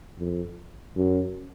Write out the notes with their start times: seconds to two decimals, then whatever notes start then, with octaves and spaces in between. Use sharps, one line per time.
0.18 F2
0.96 F#2